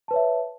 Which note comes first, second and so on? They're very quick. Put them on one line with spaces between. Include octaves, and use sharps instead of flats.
A5 B4 C#5 E5